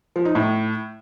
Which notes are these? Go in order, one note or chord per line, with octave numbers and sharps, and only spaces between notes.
F3
D#4
A2